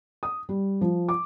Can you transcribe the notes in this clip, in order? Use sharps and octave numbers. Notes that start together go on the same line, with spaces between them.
D#6
G3
F3
D6